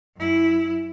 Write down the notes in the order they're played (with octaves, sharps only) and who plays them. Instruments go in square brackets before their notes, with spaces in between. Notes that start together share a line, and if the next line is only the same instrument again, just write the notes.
[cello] F#2 E4